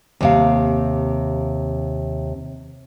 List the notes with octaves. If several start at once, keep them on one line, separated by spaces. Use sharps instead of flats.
D#2 C3 F5